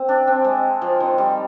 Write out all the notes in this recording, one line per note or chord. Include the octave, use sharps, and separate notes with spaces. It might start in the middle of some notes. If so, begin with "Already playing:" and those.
Already playing: C4
D4
C4
G#3
F3
D#3
G3